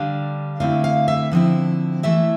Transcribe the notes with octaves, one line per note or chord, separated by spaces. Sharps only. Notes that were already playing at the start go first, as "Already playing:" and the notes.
Already playing: D3 G3 D4 F5
D3 A3 C4 E4 F5
F5
E5
D3 F3 C4 E4
E3 A3 E4 E5